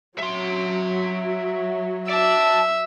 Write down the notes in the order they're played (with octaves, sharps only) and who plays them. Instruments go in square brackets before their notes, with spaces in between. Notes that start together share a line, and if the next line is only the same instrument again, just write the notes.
[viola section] F#3 [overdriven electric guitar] E5 C6
[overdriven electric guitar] D5 A5 [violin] E5